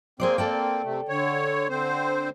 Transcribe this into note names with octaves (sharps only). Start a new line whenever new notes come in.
A#3 C4 G#4 C5 D5
A4 D5 G5
C3 A3
D3 C#5
D3 C4 C5